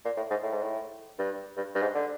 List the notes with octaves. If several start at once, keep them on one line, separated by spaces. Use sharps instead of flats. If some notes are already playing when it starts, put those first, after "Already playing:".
A#2
A2
G#2
A2
G#2
A2
G2
G2
G2
G#2
D3